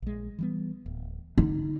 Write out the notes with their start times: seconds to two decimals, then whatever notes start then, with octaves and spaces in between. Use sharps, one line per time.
0.02 A#1 G#3
0.39 E3 G3 B3
0.86 D1
1.38 D3 D#4